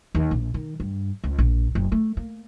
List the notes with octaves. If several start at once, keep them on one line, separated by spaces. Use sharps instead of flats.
D#2
A#1
D#3
G2
C#2
A#1
F#1
A3
A#3